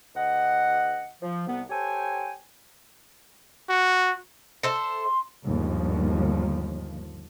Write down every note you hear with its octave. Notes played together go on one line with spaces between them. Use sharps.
D2 D#5 F#5
F3
C2 B3
G4 A4 C5 C#5 G5 G#5
F#4
A4 C5 E5
C6
G1 D#2 G#2 F3